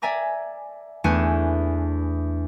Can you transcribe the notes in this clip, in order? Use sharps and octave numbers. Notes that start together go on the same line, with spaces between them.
D5 E5 G#5 A#5 D6
E2 A3 D4 G#5 C#7 E7